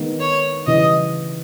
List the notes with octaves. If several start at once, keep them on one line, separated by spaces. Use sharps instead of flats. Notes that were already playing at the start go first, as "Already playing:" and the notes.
Already playing: D#3 G#3 B3 D#4
C#5
C#3 E3 G3 D#5